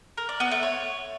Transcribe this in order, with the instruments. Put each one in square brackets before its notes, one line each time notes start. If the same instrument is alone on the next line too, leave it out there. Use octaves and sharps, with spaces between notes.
[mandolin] A#4
D5
B3
A3
C#5